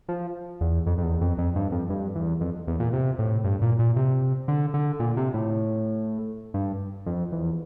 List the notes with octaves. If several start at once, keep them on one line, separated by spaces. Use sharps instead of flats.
F3
E2
F2
F2
E2
F2
F2
G2
F2
G2
E2
F2
E2
A#2
C3
A2
G2
A#2
A#2
C3
D3
D3
A#2
C3
A2
G2
F2
E2